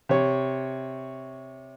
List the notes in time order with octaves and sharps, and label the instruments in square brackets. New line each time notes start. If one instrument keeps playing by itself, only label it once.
[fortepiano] C3 C#5